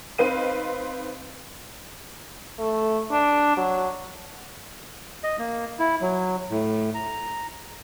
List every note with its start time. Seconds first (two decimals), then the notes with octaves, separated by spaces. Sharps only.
0.18 C4 D#4 B4 F5 D#7
2.58 A3
3.11 D4
3.57 F#3
5.24 D#5
5.39 A#3
5.79 E4
6.01 F#3
6.51 A2
6.94 A#5